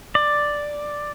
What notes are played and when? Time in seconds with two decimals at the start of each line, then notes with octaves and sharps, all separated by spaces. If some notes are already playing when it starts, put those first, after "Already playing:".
0.15 D5